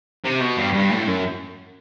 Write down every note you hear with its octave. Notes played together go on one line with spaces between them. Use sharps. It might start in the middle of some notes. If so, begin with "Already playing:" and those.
C3
B2
G2
G2
A2
F#2